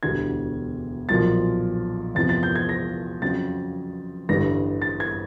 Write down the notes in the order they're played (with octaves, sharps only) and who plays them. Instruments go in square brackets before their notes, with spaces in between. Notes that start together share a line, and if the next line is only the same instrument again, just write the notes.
[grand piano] E1 D2 D3 G3 G#6
B1 A#2 F3 A6
E2 C3 F3 A6
A6
G6
G#6
A#6
F2 C#3 F#3 A6
A1 G2 D3 G3 A#6
A6
G#6